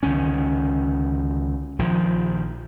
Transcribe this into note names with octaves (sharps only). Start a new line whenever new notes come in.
C#2 D3 D#3 C#4
A#1 D#3 F3